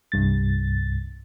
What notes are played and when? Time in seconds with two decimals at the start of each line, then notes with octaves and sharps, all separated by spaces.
0.12 C2 G2 A6